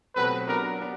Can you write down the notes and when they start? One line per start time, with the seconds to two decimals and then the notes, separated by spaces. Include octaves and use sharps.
0.15 B2 F#3 A3 C4 B4
0.48 F#3 B3 D4 A#4
0.80 B3 D4